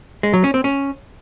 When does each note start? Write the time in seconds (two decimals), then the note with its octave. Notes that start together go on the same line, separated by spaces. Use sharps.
0.23 G#3
0.34 F#3
0.44 C#4
0.54 C4
0.64 C#4